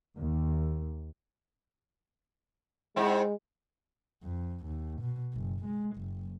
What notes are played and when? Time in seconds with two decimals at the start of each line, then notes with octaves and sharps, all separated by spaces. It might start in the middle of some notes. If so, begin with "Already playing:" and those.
0.17 D#2
2.96 G#2 G#3 C4 E4
4.23 F2
4.66 D#2
5.01 B2
5.33 F#1
5.65 G#3
5.97 F#1